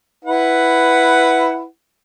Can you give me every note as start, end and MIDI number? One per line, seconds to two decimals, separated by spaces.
0.25 1.64 64
0.25 1.64 71
0.25 1.64 78